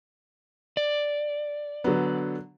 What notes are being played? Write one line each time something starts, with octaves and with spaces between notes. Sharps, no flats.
D5
D3 F#3 B3